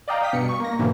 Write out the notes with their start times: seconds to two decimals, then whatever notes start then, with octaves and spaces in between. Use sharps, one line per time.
0.08 D5 D#5 F5 G5 A#5
0.20 F5 G5 D#6 B6
0.33 G2 B2 C#7
0.49 C#6
0.60 A#3 A#6
0.79 G#2 B2 D3 E3 A#3